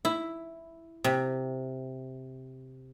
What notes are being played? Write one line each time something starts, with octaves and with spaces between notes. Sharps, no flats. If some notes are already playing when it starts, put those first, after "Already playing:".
E4
C3